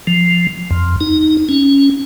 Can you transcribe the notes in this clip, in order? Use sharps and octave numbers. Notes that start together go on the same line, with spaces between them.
F3
F2
D#4
C#4